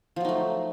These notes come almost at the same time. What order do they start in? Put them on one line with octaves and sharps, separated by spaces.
F3 F#3 D#4 A3